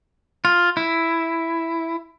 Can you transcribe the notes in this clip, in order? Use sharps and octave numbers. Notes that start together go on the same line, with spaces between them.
F4
E4